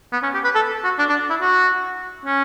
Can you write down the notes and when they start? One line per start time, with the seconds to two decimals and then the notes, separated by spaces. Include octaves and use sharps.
0.13 B3
0.23 C#4
0.34 G4
0.44 B4
0.55 A4
0.84 F#4
0.99 D4
1.09 D4
1.30 E4
1.41 F#4
2.26 C#4